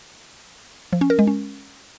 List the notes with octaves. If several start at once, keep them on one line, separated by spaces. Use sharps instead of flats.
F3
C#4
A#4
G#3
C#4